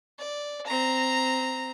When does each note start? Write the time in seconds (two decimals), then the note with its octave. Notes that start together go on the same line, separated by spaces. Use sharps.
0.19 D5
0.66 C4 A#5